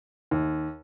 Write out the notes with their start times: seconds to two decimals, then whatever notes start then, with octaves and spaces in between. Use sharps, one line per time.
0.31 D#2